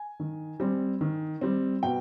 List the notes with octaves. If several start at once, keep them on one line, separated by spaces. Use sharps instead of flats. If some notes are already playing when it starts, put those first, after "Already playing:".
Already playing: G#5
D#3
G3 C4
D#3
G3 C4
B2 G5